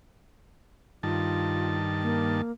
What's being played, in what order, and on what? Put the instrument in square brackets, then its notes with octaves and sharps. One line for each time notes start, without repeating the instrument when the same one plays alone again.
[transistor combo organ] G2 D#3 A5 [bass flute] F4
[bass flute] A#3